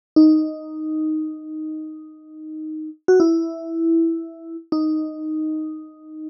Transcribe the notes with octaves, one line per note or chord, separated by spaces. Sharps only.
D#4
F#4
E4
D#4